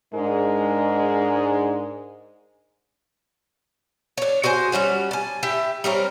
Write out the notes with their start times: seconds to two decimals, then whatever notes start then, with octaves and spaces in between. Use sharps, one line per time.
0.14 G#2 G#3 D4 A#4
4.17 D4 C#5
4.44 F#4 G#4 C5 G#5
4.72 G3 G#3 C#4 F#4
5.11 G#5 A5
5.43 E4 G4
5.84 G3 C4 C#4 A#4